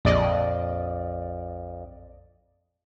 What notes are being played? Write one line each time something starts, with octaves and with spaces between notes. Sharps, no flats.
A#1 F2 D5 D#5